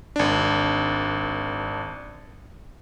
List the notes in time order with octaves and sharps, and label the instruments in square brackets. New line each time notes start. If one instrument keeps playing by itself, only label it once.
[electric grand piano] G#1 D4